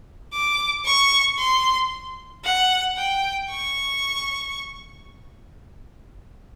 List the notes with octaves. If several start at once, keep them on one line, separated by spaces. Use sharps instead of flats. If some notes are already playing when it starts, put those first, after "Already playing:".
D6
C#6
C6
F#5
G5
C#6